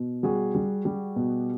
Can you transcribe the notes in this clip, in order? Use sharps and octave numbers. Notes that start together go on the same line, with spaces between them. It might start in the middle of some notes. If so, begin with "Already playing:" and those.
Already playing: B2
G3 F#4 G#4
G3
G3
B2